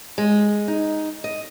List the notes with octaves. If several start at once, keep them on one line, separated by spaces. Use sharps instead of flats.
G#3
D#4
D#5